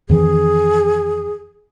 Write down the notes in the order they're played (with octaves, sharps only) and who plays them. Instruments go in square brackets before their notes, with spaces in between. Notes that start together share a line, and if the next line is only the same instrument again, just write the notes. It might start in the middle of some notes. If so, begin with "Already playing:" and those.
[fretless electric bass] F2 D#3 E3 [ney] G#4